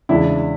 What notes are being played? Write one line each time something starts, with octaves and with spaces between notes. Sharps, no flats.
E2 C#3 E3 G#3 D4 E4